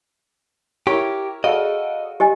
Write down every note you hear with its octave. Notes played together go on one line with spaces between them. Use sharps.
E4 G4 A#4 C#5
F#4 G#4 A4 D#5 F5 F#5
G4 D#5 G#5